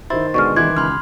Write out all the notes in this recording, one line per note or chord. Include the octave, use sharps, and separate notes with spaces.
D#3 E4 C5 A6
B2 D3 G#3 C#6 F6
D#3 E3 E4 C6 D6 F#6 G#6
C#2 B5 C6 F6